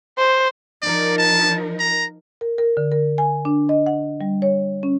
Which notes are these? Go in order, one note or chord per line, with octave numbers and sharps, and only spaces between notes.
C5
F3 D#4 A#4 D5
A5
A#5
A#4
A#4
D3
A#4
G#5
D4
D#5
F#5
G3
C#5
C#4